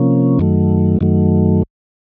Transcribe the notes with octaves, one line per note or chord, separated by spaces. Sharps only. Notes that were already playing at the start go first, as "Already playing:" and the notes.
Already playing: C3 F3 A#3 C#4
F#2 D#3 F#3 A3
F#2 D#3 F#3 A3